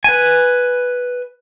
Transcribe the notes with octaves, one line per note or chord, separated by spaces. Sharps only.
B4 G#5